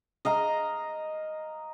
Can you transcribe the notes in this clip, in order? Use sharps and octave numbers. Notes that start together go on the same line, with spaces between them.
D#5 F5 A#5